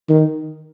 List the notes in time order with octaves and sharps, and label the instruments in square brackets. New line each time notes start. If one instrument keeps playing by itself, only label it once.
[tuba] D#3